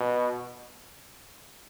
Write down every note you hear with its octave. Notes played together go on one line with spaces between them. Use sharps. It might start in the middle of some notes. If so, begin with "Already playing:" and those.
Already playing: B2